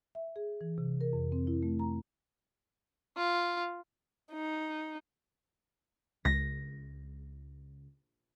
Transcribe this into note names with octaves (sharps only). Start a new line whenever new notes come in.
E5
G#4
E3
C3
A#4
F2
C4
E4
A3
A#5
F4
D#4
C#2 A#6